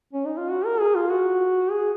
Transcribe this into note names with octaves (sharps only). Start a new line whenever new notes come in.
C#4
D#4
F4
F#4
A#4
G#4
F4
F#4
G#4